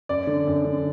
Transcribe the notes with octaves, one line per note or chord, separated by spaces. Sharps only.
F#2 D5
D3
F#2
D3